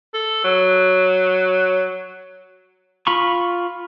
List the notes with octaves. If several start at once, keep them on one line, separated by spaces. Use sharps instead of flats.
A4
F#3
F4 B5 C#6